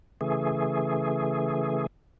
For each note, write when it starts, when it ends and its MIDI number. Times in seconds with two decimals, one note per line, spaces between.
0.21 1.87 49
0.21 1.87 52
0.21 1.87 57
0.21 1.87 68